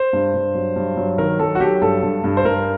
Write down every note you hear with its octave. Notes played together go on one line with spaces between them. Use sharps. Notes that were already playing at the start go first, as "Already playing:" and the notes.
Already playing: C5
G2
G2
F#3
G2
F#3
D#3 A#4
F#3 A4
F#4
F#3 G4
G2 A4
G2
G2
C5
G2 A#4